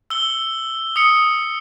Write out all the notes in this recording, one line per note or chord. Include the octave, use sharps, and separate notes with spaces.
E6 G7
D#6 C#7